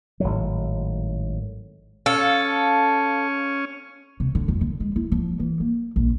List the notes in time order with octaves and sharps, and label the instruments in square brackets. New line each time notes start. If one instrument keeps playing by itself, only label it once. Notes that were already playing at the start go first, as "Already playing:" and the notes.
[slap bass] G#1 A2 F#3
[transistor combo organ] C#4 [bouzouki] A4 [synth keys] F5
[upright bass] C3
D3
F2
D3
G#3
E4
F3
E3
A#3
A#1